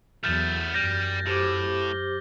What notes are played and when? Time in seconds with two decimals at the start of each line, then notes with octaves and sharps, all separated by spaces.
0.24 E2 F#3 A3 B3 F6 G6 A6
0.74 F#2 G3 G6 A#6
1.27 A2 G4 C5 D6
1.82 G7